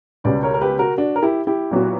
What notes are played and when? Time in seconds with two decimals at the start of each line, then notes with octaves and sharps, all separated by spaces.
0.24 C#2 B2 G3 C#4 B4 D5
0.43 A#4 C#5
0.54 A#4
0.61 G4 B4
0.79 F#4 A#4
0.98 D4 F#4
1.16 A#4
1.22 E4 G4
1.47 E4 G4
1.71 A#2 F#3 B3 F#4